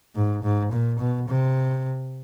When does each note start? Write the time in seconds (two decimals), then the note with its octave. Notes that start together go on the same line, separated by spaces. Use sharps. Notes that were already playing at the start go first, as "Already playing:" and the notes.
0.15 G#2
0.43 G#2
0.72 A#2
0.99 B2
1.28 C3